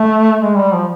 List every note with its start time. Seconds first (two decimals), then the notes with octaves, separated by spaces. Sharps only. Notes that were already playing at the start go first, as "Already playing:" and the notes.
Already playing: A3
0.41 G#3
0.57 G3
0.73 F3